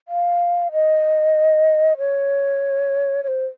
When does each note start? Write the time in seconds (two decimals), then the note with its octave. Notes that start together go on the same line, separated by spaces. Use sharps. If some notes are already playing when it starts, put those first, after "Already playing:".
0.08 F5
0.72 D#5
1.98 C#5
3.23 C#5
3.28 C5